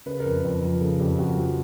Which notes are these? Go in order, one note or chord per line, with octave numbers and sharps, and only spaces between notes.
C#3 B4
A#4
F2
B4
F2
F3
C#3 A4
F2 G4
F2 F#4
F3